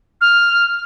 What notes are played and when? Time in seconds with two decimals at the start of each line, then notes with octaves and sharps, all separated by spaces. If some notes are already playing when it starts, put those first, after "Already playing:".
0.21 F6